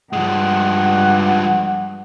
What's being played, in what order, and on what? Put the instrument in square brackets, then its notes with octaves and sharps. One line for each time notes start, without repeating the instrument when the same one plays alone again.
[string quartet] G2 [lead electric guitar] F3 G#3 [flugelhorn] F#5